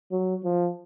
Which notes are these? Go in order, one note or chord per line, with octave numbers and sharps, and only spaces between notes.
F#3
F3